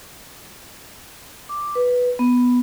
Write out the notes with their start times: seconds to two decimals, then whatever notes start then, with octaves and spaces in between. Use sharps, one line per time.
1.49 D6
1.75 B4
2.19 B3